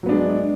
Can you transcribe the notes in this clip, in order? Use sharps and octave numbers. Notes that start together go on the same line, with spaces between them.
F#3 G#3 B3 D4